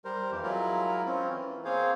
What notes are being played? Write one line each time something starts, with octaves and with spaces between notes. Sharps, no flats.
G3 A#4 C5
F2 E3 G4
F#3 G#3 E4 F4 A#4
C4 C#4 F4
E3
A#3 C4 G#4 C5 C#5 F5